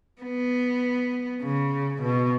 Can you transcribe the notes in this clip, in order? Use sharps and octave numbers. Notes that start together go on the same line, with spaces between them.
B3
C#3
B2